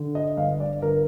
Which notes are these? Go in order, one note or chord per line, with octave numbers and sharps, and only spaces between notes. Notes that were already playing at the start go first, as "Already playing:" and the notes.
Already playing: D3
D#5
G1 F5
D5
G1 A#4